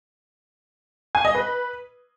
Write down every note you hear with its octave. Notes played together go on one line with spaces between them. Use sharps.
G#5
D#5
B4